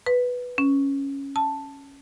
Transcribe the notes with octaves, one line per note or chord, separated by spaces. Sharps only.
B4
C#4
A5